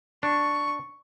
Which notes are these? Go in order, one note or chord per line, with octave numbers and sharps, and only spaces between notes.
D4 C#6